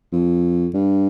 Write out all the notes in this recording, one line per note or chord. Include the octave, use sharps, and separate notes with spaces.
F2
G2